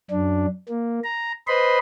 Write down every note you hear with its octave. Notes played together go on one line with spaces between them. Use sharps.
F#2 D4
A#3
A#5
B4 C5 D#5 B5 C6